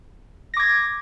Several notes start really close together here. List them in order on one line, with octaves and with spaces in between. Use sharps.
A#6 D6 G#6